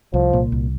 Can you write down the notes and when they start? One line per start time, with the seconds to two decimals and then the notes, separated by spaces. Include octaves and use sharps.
0.13 C2 F3
0.33 A#2
0.52 C2